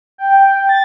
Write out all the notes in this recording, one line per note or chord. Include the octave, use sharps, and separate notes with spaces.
G5
A6